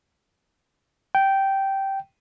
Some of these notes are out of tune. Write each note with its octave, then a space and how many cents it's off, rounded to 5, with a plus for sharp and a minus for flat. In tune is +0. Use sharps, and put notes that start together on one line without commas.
G5 -10